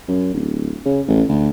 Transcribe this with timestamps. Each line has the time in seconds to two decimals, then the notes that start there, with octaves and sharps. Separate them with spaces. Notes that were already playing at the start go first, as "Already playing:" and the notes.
0.08 F#2
0.34 D1
0.86 C#3
1.08 A1
1.28 D2